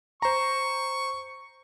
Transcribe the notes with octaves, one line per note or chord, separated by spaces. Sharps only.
C5 A#5 C#6